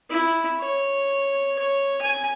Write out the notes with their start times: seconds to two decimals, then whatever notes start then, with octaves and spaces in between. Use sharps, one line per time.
0.10 E4
0.60 C#5
1.59 C#5
2.02 G#5